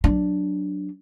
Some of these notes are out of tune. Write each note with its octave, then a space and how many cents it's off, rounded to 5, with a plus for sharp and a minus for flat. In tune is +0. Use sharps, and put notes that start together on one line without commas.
F#3 +0 D4 +0